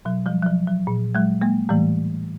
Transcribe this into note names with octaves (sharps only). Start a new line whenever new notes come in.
B2 F#3
F3 G3
F#3
F3
F#3
A#2
F#3 G#3
G#3 A#3
A2 E3 G3 A3